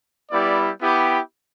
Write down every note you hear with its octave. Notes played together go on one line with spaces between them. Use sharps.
G3 B3 E4 G4 D5
B3 E4 G4